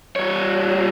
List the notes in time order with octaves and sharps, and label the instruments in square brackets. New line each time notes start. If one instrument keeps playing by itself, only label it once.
[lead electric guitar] G3 C#5